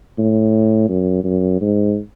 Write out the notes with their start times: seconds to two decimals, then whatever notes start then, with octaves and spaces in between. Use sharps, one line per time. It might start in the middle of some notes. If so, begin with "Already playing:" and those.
0.18 A2
0.89 F#2
1.24 F#2
1.61 G#2